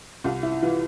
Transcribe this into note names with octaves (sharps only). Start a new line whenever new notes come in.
C2 F4
E4
E3 F4